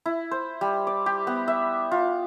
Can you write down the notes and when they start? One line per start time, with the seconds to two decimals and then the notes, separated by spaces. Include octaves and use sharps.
0.06 E4
0.31 C5
0.61 G3
0.87 D5
1.06 G4
1.27 B3
1.48 E5
1.91 F4